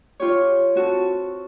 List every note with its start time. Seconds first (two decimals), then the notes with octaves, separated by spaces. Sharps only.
0.20 F4 G4 C#5
0.75 C4 F#4 A4